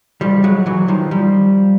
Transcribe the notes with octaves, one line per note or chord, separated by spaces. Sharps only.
F3 G3
F#3 G#3
E3 F#3
D#3 F3
F3 G3